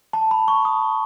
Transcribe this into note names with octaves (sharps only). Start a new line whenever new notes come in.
A5
B5
C#6
D#6